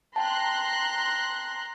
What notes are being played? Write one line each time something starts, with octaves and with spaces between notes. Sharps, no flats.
G5 A5 A#5 C6 F#6